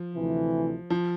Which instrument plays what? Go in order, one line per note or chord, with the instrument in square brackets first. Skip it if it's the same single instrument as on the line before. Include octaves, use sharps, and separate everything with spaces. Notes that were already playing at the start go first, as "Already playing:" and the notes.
Already playing: [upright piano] F3
[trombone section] D2 C3 E3
[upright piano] F3